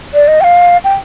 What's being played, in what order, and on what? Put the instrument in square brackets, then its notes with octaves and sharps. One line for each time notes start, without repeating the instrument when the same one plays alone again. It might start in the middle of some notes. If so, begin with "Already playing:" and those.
[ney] D5
D#5
G5
F5
G5